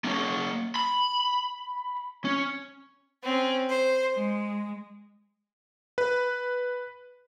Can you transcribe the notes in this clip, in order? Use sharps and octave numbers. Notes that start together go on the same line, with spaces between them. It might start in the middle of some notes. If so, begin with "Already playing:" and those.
A#3 C#4
B5
C#4
C4 C#4
C5
G#3
B4